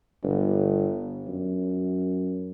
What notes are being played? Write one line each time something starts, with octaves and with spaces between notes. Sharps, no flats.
G1
F#2